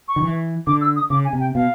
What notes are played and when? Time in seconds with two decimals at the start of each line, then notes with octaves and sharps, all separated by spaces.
0.08 C#6
0.16 D#3
0.23 E3
0.67 D3 D6
0.81 E6
0.96 D#6
1.10 C#3 D6
1.25 G#5
1.33 C3
1.40 G5
1.55 B2 F5